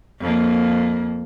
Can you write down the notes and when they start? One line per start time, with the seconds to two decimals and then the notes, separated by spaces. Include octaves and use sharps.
0.20 F2 A#3